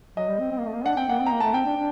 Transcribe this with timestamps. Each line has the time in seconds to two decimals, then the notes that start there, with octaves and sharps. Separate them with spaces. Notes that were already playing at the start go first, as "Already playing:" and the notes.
0.17 F#3 D#5
0.28 G3
0.39 C4
0.51 C4
0.58 A#3
0.66 A3
0.73 A#3
0.85 D4 F#5
0.96 C4 G5
1.08 A#3 F#5
1.19 C4
1.26 A#3 A#5
1.40 A3 A5
1.54 C4 G5
1.65 D4
1.76 D4